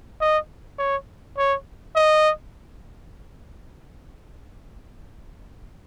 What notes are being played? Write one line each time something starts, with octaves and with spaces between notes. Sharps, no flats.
D#5
C#5
C#5
D#5